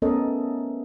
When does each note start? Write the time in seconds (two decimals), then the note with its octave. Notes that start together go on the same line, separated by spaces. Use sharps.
0.02 A3 B3 C#4 A4 A#4 D#5